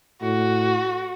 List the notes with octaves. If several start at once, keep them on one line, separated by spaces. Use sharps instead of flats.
A2 F#4